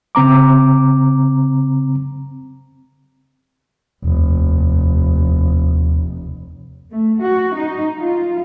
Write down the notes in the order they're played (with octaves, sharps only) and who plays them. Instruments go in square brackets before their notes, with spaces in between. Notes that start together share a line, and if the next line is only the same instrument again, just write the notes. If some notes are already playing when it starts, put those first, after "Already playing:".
[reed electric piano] C#3 C4 A#5 D6
[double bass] F1 [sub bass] D#2
[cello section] A3
F#4
D#4
F4